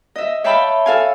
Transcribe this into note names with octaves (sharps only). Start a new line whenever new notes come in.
D#5 E5
C#5 E5 F5 G5 A5 B5
A4 F5 G#5